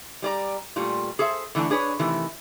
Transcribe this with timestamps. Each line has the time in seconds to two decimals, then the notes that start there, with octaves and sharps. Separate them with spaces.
0.22 G3 D5 A#5
0.76 A#2 G3 A3 F4
1.19 G#4 A4 C5 E5
1.55 D3 E3 A3 D4
1.70 D4 G#4 B4 C#5
1.99 C3 D#3 E3 A3